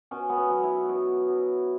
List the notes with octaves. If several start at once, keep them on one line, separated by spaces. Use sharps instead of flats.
B2 C#4
B3
C#4
F#3
E4
B2
F#3